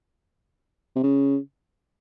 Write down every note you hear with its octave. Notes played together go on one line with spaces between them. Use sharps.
C3
C#3